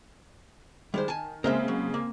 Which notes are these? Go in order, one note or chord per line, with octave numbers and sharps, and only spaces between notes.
D#3 G3 G#3 C5
G#5 A5
C#3 G#3 A#3 C4 A#4 C5 E5
F#3
A#3